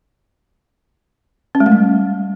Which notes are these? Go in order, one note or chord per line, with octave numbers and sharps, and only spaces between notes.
C#4
G#3
A3
G3